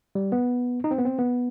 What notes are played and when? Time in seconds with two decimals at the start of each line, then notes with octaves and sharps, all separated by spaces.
0.15 G3
0.32 B3
0.84 D#4
0.91 C4
0.99 B3
1.05 C4
1.19 B3